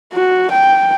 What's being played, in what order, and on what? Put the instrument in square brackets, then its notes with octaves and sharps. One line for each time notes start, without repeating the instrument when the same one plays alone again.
[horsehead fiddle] F#4
G5